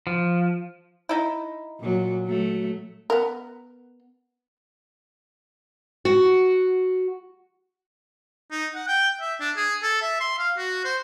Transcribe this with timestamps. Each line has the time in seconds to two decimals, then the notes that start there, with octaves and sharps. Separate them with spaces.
0.07 F3
1.09 D#4 E4
1.80 A#2 F#3
2.27 F#3 A3
3.10 B3 A#4
6.05 F#4
8.51 D#4
8.75 F#5
8.88 G5
9.21 E5
9.40 D4
9.56 G#4
9.83 A4
10.01 E5
10.20 C6
10.39 F5
10.57 F#4
10.84 C5